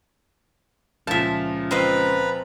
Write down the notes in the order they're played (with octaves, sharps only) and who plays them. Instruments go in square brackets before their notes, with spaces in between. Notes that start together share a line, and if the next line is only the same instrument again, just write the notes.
[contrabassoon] C#2 [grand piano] A#2 F3 [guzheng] E5 A5
[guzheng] C4 D#5 F5 [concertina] B4 A#5 B5